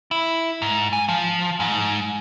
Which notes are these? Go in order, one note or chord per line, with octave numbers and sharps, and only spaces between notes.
E4
G#2
G#5
F3
G#2